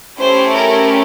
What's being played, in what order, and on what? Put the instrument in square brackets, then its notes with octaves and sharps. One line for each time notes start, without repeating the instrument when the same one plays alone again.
[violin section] A3 C#4 E4 G4 C5
A#4